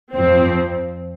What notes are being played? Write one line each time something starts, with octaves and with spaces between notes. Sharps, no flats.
F2 F3 C4